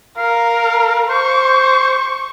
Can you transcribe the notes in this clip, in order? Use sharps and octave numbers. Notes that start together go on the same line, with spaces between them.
A#4 F5
C5 C#6